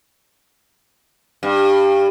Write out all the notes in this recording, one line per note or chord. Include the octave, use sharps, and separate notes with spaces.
G2